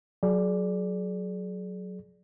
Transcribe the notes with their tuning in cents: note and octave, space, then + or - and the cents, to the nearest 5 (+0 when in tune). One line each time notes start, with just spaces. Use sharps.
F#3 +0 G#4 +35 D5 +0